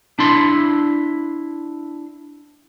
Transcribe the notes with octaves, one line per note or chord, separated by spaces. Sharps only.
D4 E4 C6